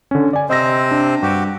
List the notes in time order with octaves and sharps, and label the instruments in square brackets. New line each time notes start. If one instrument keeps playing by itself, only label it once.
[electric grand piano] D3 C#4
D5 G#5
[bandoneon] C3 C4 C5 [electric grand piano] D#5 E6 A#6
[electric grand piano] D4
[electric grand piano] G2 [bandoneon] F#4 G4